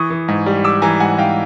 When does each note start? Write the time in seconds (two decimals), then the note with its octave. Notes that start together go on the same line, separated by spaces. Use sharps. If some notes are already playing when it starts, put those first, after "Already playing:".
Already playing: E3 C#6 D#6
0.10 E3
0.28 G#2
0.46 G3
0.64 G3 D6 E6
0.82 E3 G#5 A#5
1.00 G#2 F#5 G#5
1.18 G#2 F5 G5